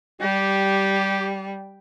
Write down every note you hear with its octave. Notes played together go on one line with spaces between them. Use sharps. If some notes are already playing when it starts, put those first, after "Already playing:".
G3 G4